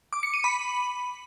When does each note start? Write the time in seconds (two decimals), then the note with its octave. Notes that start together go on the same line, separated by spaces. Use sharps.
0.13 D6
0.23 C#7
0.34 D#7
0.44 B5